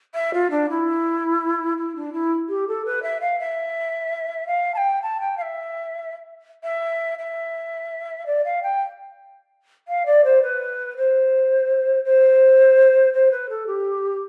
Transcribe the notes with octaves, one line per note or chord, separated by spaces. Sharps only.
E5
F4
D4
E4
E4
D4
E4
G4
A4
B4
E5
F5
E5
F5
A5
G5
A5
G5
F5
E5
E5
E5
D5
F5
G5
F5
D5
C5
B4
C5
C5
C5
B4
A4
G4